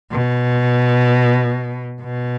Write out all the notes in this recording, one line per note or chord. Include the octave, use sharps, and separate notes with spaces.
B2
B2